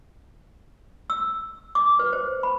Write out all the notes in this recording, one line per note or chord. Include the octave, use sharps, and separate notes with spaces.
E6
D6
B4
C5
B5